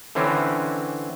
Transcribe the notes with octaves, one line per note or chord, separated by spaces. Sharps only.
D3 E3 C4 C#4